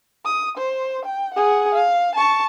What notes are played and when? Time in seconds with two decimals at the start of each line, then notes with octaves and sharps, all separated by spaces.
0.25 D#6
0.57 C5
1.05 G5
1.34 G#4 F#5
1.75 F5
2.15 A5 C#6